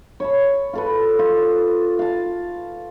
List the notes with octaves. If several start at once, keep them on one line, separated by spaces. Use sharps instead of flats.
C#5 A5 B5
F4 A4 B4
F4
F5 A5